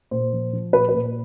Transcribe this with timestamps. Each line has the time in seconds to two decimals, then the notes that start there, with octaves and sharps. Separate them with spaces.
0.11 A#2 C5
0.33 F3
0.53 F3
0.73 A#2 B4
0.89 B4
0.94 A#2